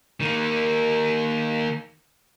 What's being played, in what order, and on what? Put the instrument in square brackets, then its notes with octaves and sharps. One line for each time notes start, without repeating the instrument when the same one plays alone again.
[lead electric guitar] D#3 A#3